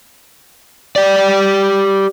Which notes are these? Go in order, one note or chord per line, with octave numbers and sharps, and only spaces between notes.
G4 D5